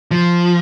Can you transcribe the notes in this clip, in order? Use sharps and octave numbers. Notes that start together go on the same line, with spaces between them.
F3